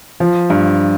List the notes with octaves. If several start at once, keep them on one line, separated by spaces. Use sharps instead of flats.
F3
G2